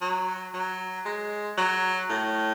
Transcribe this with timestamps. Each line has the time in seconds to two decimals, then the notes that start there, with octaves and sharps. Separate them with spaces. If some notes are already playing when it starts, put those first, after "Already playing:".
0.01 F#3
0.54 F#3
1.06 G#3
1.57 F#3
2.10 A2